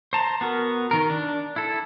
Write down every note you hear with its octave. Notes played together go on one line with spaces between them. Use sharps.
C5 A5 A#5
B3 F#4 A#4
D#3 A#4
D4
E4 A4